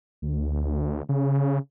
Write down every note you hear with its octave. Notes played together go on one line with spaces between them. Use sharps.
D2
C#3